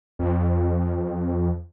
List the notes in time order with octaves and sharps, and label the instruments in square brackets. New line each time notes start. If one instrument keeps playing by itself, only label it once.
[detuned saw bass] F2